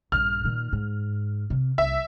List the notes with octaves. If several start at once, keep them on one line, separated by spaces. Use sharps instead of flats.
A#1 G2 F6
A#2 D#3
G#2
C3
C2 E5